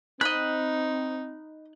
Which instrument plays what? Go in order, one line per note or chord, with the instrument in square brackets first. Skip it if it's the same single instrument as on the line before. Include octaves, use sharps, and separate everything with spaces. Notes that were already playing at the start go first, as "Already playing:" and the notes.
[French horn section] C4 [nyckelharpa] D#4 [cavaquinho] D#5 B5 [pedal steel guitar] F#6